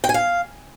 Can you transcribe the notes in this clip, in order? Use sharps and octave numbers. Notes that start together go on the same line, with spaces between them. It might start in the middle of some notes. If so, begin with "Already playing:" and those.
G5
G#5
F5